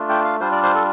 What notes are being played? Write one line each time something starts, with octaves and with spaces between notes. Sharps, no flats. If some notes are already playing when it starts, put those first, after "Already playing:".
Already playing: A3 D4 F4
G5
F5
G3 D4 F4 C5
D5
C5
A4